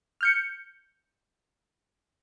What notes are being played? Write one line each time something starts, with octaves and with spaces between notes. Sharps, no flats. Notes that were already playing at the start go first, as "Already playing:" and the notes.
F6 G6 C#7